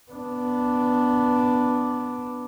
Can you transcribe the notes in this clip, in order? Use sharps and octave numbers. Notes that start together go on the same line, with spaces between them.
B3 D4